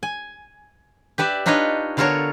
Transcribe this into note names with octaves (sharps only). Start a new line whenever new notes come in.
G#5
G4 B4 D5 E5
D4 D#4 F4 B4 C#5 D#5
D3 B3 F4 A4 A#4 C#5